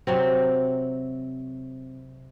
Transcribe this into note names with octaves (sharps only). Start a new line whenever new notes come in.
C3 F#3 C4